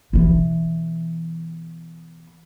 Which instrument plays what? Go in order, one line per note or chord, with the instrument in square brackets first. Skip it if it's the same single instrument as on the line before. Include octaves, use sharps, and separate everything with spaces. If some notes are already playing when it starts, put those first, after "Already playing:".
[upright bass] B2 E3